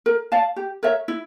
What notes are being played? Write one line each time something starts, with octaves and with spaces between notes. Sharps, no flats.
A#4
D5 F5 A5
G4
A#4 C#5 E5
E4